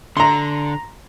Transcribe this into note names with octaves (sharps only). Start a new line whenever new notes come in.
D3 A#5 C6